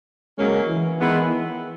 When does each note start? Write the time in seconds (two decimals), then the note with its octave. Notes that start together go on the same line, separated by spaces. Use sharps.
0.38 C#3 F#3 G#3 A#3 C#4
0.68 E3
0.97 D#3 G#3 B3 E4